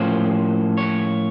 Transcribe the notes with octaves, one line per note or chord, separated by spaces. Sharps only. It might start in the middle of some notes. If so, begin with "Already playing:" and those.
Already playing: A2 F3 A#3 C#4 C5
C#5